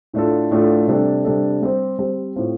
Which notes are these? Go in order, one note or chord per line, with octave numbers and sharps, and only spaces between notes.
A2 A3 D4 F4 A4
A2 A3 D4 F4 A4
C3 G3 D4 A4
C3 G3 D4 A4
G3 C4 G4 C5
G3 C4 G4 C5
A2 A3 C4 F4 C5